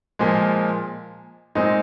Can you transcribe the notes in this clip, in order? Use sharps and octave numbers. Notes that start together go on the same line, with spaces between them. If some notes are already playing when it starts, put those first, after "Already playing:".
A#2 F3 G#3
A#2 G#3 C4 D#4